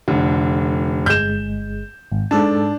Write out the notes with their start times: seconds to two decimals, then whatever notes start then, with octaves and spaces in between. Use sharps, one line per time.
0.08 F1 D3
1.06 G1 G#3 G6 E7
2.12 G#1
2.31 G#2 D4 A4 A5